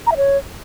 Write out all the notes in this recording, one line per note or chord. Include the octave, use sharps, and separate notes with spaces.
A#5
E5
C#5